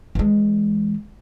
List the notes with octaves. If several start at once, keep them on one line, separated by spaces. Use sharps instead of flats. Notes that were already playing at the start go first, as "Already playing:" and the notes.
E3 G#3